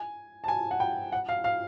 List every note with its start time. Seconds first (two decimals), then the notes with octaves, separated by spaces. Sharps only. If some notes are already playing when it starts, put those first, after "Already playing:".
Already playing: G#5
0.44 A5
0.48 G#5
0.71 F#5
0.80 G5
1.12 F#5
1.29 F5
1.44 F5